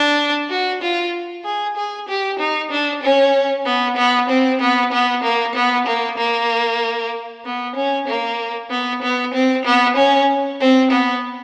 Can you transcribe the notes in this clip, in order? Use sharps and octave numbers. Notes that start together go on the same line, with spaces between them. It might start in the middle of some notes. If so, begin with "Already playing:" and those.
Already playing: D4
F#4
F4
G#4
G#4
G4
D#4
D4
C#4
B3
B3
C4
B3
B3
A#3
B3
A#3
A#3
B3
C#4
A#3
B3
B3
C4
B3
C#4
C4
B3